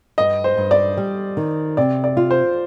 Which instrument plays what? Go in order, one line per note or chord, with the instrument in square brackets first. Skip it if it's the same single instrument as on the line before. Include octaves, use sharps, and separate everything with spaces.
[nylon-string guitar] G2 [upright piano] D#5
[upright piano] C5
[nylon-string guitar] G2
[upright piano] D5
[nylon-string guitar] G3
D#3
[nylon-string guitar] C3 [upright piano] D5
[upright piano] D5
[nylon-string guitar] F4
[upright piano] C5